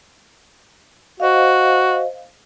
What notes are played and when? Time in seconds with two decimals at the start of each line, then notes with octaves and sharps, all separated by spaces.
1.20 F#4 C5 D#5 F5